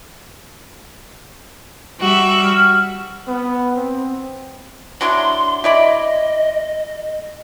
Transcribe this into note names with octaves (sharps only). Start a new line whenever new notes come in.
G3 F#4 E5
F6
B3
C4
F#3 D4 E4 C6
E4 D5 D#5 B5